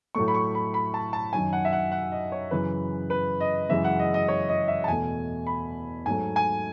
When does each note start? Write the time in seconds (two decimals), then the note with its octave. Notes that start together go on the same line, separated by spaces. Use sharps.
0.15 A2 F#3 A3 C#6
0.28 B5
0.34 C#6
0.55 B5
0.74 B5
0.94 A5
1.13 A5
1.33 F#2 D#3 F#3 G#5
1.53 F#5
1.65 E5
1.73 F#5
1.92 F#5
2.12 D#5
2.32 C#5
2.51 F#2 C#3 E3 B4
3.10 B4
3.40 D#5
3.69 F#2 C#3 E3 G#3 E5
3.84 F#5
3.99 D#5
4.14 D#5
4.28 C#5
4.49 D#5
4.68 E5
4.84 A5
4.88 E2 B2 A3 G#5
5.47 B5
6.06 G#2 F#3 A3 G#5
6.36 G#5